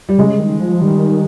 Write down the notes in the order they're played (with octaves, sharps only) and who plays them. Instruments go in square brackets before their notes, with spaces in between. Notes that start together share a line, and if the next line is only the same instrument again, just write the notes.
[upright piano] G3
[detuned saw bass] C#3 [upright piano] G#3
[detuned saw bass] D#3
F3
[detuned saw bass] D#3 [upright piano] G3